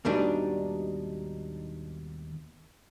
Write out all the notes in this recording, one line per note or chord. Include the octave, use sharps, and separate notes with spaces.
D#2 G#2 B2 G3 D4 D#4